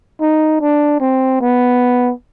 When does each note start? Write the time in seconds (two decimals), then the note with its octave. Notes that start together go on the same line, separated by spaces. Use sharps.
0.21 D#4
0.61 D4
1.01 C4
1.41 B3